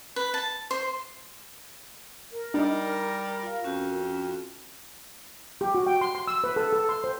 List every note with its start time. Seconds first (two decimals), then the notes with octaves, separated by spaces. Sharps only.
0.16 B4
0.34 A5
0.71 C5
2.31 A#4
2.54 G3 D4 D#4
3.43 F4 F5
3.64 F2 C#4 F#4
5.61 G4
5.75 F#4
5.87 G5
6.01 C6
6.15 C6
6.27 E6
6.44 B4
6.56 A4
6.73 A4
6.89 C6
7.04 C5